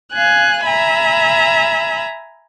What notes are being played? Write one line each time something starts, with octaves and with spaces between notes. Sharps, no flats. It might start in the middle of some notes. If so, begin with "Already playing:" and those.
F5 G#5 F#6
E5 G#5 A#5 B5